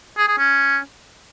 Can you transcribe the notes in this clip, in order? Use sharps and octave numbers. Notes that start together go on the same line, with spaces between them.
G#4
G#4
C#4